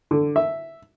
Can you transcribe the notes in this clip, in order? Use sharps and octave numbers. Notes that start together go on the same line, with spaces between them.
D3
E5